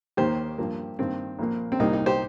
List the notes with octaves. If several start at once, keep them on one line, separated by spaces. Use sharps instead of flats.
D#2 D#3 A#3 G4 C5
G2 F3 A#3
G2 D#3 A#3 C4
A#1 A#2 A#3
C4
C2 A#2 G3 A#3 D#4
D#4
G4 C5